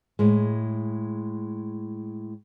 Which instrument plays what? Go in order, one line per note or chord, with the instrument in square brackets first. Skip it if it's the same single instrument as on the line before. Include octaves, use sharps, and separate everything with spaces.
[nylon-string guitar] A2 G#3